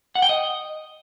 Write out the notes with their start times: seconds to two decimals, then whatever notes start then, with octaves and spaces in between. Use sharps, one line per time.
0.15 F#5
0.22 G5
0.29 D#5